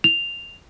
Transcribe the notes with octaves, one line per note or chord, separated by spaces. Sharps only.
F7